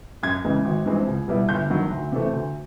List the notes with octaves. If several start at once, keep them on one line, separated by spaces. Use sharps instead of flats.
F#2 G#6
C#3 E3 G#3
G#1
G2 E3 G#3 C4
C#2
B2 G3 B3 E4
G1 G6
G2 D#3 F#3
D2
C3 E3 A3
D2